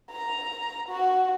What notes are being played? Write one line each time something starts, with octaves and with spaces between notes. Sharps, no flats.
A#5
F#4